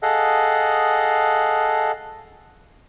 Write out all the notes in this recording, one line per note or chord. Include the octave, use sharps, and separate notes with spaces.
G#4 A4 D#5 F5 F#5